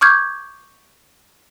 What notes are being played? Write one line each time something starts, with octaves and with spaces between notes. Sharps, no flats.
C#6 D6 F6 G6 G#6